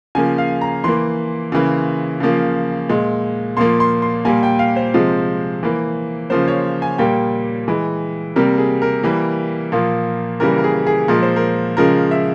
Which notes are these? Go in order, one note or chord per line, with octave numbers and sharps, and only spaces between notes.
C#3 F3 A#3 G#5
F5
A#5
E3 A#3 C6
C#3 E3 A#3
C#3 F3 A#3
A#2 G#3
A#2 F3 A#3 C6
C6
C6
A#2 G3 A#3 G#5
G5
F5
C5
C3 F3 G#3
E3 A#3
C#3 F3 A#3 C5
C#5
G#5
A#2 G3 A#3 G5
E3 G#3
C3 G3 A#3 A#4
G#4
A#4
E3 G3 A#3
A#2 F3 A#3
C#3 E3 G3 A#3 A#4
A#4
G#4
G#4
A#2 F3 G#3 A#4
C5
A#4
C#3 F3 G#3 A#4
E5